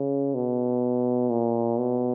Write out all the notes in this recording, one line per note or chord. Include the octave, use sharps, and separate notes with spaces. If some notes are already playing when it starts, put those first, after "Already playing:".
Already playing: C#3
B2
A#2
B2